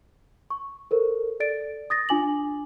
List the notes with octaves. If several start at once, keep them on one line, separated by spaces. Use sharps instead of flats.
C#6
A4 A#4 C5
A4 D5 A6 D7
D#6 A6 A#6
D4 F4 G#5 D6 F#7